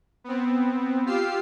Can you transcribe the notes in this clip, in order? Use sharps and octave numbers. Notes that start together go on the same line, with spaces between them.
B3 C4
F4 G4 F5 E6 C7